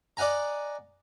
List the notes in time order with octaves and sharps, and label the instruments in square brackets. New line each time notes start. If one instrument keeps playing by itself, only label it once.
[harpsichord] D5 D#5 F#5 G#5 A#5